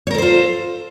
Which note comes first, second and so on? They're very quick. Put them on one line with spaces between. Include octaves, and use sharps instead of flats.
C#5 A#4 A4 C5 F4